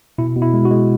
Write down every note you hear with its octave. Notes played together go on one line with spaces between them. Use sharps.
B2 E4
B2
E4
G#3
F#4
G#3